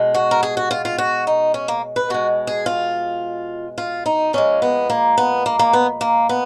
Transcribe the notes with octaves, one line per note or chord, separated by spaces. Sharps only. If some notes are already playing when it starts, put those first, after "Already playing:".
Already playing: B2 G#3
F#4
A#4
G#4
F#4
F4
F4
F#4
D#4
C#4
A#3
B4
B2 G#3 F#4
G#4
F4
F4
D#4
A#2 F3 G#3 C#4
B3
A#3
B3
A#3
A#3
B3
A#3
B3